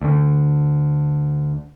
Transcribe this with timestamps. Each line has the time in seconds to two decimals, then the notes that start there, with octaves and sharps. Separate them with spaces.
0.01 D2 D3